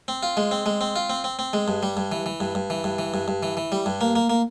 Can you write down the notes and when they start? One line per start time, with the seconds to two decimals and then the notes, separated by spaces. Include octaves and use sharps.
0.08 C4
0.23 F4
0.37 G#3
0.51 C4
0.66 G#3
0.81 C4
0.96 F4
1.10 C4
1.24 C4
1.39 C4
1.53 G#3
1.68 G2
1.83 G3
1.97 G2
2.12 E3
2.26 E3
2.40 G2
2.55 G2
2.70 E3
2.84 G2
2.98 E3
3.14 G2
3.28 G2
3.43 E3
3.57 E3
3.72 G3
3.86 G2
4.01 A#3
4.16 A#3
4.30 A#3